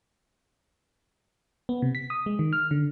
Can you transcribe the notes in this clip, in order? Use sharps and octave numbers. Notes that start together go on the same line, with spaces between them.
B3
C3
B6
D#6
G#3
D#3
F6
D3